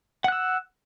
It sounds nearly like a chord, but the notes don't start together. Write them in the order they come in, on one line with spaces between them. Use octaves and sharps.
F#5 F#6 E6